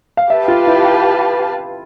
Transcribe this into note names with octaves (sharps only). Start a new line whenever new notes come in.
F5
G4 B4 E5 F5 A5
F4
E4